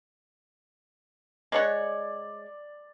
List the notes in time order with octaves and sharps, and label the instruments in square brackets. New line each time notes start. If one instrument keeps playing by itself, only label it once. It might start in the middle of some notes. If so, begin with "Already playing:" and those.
[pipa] G#3 C#5 F#5 [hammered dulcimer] D5